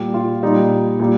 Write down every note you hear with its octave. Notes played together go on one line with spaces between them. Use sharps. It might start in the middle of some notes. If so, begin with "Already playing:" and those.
Already playing: A#2 G3 G4
F4
A#2 G3 D#4
A#2 G3